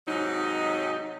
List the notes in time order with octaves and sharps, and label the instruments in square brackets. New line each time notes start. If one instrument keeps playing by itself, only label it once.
[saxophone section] G#2 C3 F#3 D#4